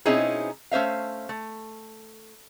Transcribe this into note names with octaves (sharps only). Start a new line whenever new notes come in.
B2 C4 C#4 D#4 E4 G#4
A3 C#4 C5 E5 F5
A3